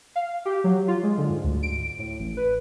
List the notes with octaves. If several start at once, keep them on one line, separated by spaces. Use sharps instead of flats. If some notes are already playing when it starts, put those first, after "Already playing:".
F5
G4
F#3
F4
G#3
D3
G#2
D2
D7
A2
A1
B4